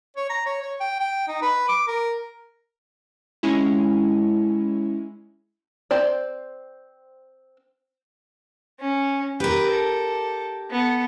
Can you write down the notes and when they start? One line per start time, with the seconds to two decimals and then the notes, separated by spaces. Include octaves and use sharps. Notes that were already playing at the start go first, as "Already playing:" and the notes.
0.16 C#5
0.30 A#5
0.46 C#5
0.62 C#5
0.80 G5
1.00 G5
1.28 D#4
1.42 B4
1.69 D6
1.87 A#4
3.43 G#3 C#4 E4
5.91 C4 C5 D5
8.80 C#4
9.40 G4 A#4 B4
9.71 A4
10.71 B3 A4